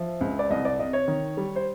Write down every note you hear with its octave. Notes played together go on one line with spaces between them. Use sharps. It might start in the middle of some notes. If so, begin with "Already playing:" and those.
Already playing: F3 E5
C#2
D5
C2 D#5
D5
C3 D#5
C#5
D#3
G3
C5